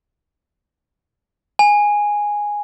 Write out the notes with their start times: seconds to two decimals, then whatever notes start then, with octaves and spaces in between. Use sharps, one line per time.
1.59 G#5